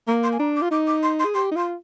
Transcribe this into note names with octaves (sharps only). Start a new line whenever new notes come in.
A#3 A#5
C6
G#5
D4 A#5
D6
F4
D#4 D6
D6
C6
C6
G#4
G4 C6
D#4
F4 C6